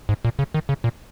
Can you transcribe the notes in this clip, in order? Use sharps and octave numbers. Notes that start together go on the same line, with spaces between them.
G#2
A#2
C#3
D#3
C#3
A#2